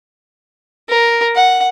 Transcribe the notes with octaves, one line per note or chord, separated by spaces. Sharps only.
A#4
F#5